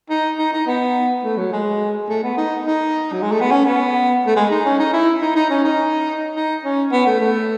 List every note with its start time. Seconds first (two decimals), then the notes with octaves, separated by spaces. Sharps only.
0.10 D#4
0.38 D#4
0.53 D#4
0.67 B3
1.24 A3
1.37 F#3
1.52 G#3
2.09 A3
2.23 B3
2.37 D#4
2.66 D#4
3.13 F#3
3.22 G#3
3.32 A3
3.41 B3
3.51 C#4
3.65 B3
4.27 A3
4.36 G#3
4.51 D#4
4.65 C#4
4.79 D#4
4.93 E4
5.21 D#4
5.35 D#4
5.50 C#4
5.64 D#4
6.35 D#4
6.64 C#4
6.92 B3
7.06 A3
7.20 A3